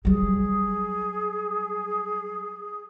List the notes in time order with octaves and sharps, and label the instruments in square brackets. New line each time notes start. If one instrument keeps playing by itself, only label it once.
[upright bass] F#3 G3 [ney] G#4